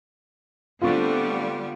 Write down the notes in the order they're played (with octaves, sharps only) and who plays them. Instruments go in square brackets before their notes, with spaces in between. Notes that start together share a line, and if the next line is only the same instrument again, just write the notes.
[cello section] D3 G3 B3 [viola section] A3 C4 D4 [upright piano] F4 C#6